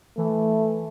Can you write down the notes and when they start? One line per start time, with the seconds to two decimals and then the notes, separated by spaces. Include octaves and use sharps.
0.18 E3 A3